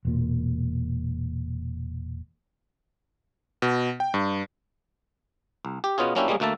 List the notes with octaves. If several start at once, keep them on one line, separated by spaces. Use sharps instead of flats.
E1 A#2
B2
G5
G2
C2
G4
B2 B3 C#4 F4 G#4
F#3 A#3 C#4 D4 E4 G4
G3 G#3 A#3 C#4 G#4
D2 A3 A#3 E5 A5